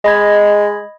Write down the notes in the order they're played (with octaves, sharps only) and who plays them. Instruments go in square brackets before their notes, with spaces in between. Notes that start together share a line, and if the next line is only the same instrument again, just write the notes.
[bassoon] G#3 [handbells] D#5 B5 G#6